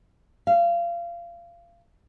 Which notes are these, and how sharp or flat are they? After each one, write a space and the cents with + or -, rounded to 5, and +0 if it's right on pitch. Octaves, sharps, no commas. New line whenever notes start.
F5 -25